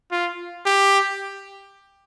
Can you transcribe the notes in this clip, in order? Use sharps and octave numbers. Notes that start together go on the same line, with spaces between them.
F4
G4